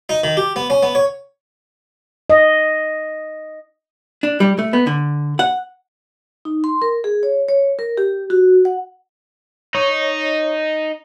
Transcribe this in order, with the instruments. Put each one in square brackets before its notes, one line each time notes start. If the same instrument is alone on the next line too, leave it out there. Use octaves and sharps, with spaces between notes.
[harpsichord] D#4
D#3
G4
B3
C#4
B3
C#5
[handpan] D#5
[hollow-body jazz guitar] D4
G3
A3
B3
D3
F#5
[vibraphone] D#4
C6
A#4
G#4
C#5
C#5
A#4
G4
F#4
F#5
[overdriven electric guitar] D#4 [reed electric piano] C#5